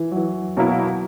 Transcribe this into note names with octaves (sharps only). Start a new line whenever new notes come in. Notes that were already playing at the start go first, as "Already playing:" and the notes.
Already playing: E3
F#3
E3
B2 F#3 A#3 E4